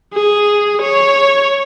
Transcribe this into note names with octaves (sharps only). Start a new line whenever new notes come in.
G#4
C#5